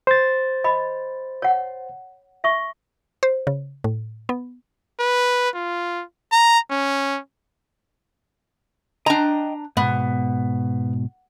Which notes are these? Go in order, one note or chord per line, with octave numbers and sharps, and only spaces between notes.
C5 A6
D#5 B5
C#5 F#5
E5 C#6
C5
C#3
A2
B3
B4
F4
A#5
C#4
D4 D#5 G5 A#5
G#2 B2 B3